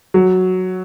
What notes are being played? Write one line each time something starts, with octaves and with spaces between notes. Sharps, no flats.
F#3